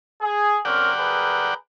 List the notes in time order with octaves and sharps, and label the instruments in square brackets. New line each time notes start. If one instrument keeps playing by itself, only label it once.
[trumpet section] G#4
[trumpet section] C4 C#4 A#4 [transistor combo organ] D5 F#5 G5
[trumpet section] G#4 A#4 B4